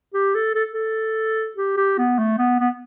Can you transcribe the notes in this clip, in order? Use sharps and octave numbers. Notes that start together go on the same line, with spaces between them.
G4
A4
A4
A4
G4
G4
B3
A3
B3
B3